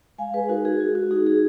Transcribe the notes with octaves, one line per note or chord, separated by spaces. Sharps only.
G#3 F5 G#5
G#4 B4
D#4 F#4 A#4
G#4
G#3 F#4
F#4
D#4 F#4 G#4
G#4